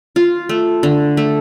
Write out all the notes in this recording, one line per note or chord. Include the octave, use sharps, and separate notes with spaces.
F4
A3
D3
A3